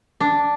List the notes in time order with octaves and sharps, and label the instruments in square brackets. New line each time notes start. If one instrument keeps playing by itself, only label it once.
[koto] D4